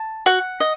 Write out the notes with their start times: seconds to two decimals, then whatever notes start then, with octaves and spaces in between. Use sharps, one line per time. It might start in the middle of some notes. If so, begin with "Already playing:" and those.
Already playing: A5
0.26 F#4 F#5
0.60 D#5